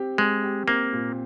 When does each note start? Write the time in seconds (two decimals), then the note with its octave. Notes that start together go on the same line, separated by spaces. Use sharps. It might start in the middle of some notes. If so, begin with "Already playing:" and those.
Already playing: C4 G4
0.18 G#3 C4
0.44 G4
0.68 A#3 C4
0.93 A#2